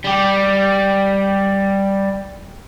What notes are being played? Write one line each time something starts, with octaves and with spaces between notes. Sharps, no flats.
G3 G4